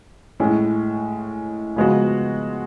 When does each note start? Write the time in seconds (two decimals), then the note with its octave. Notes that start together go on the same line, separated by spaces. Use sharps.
0.40 A2 G#3 C#4
1.76 C#3 F3 G#3 B3 F#4